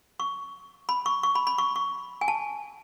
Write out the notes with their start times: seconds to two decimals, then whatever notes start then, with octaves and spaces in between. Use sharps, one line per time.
0.20 C#6
0.89 B5
1.06 C#6
1.23 C#6
1.35 B5
1.47 B5
1.58 C#6
1.76 C#6
2.21 G#5
2.28 A5